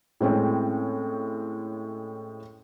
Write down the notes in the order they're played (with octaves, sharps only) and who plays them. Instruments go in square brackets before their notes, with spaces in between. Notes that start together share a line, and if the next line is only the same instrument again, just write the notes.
[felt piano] A2 G#3 C4 C#4